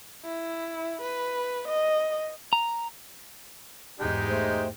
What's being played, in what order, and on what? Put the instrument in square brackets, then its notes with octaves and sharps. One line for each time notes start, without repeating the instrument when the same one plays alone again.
[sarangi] E4
B4
D#5
[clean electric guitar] A#5
[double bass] E2 G#2 [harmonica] G#3 D#4 G4
[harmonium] A3 C5